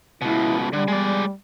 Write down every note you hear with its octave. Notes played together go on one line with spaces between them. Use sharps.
C#2 B2 E4
D3 G3
G#3 D5